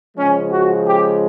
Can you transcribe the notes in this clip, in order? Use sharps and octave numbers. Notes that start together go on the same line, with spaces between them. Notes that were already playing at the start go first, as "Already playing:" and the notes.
C#3 F3 G#3 C#4
F#4
G4